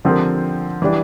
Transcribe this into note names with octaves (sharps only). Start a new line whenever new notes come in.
D3 F3 C4 G4 A#4
E3 G3 D4